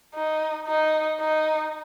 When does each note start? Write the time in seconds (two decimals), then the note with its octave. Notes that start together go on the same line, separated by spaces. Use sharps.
0.14 D#4
0.67 D#4
1.21 D#4